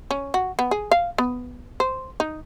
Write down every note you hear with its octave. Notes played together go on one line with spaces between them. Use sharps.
C#4
F#4
B3
G#4
F5
B3
C5
D#4